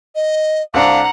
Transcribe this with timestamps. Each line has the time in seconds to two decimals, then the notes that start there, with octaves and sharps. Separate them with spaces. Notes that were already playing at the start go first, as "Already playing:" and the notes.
0.15 D#5
0.74 C2 D4 F5 F#5 A#5